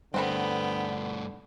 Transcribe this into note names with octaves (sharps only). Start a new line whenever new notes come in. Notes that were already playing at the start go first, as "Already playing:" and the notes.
G2 D3 A3 B3 C4 B4 G5 B5